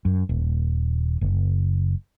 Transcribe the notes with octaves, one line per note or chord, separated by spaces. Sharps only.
F#2
D#1
F#1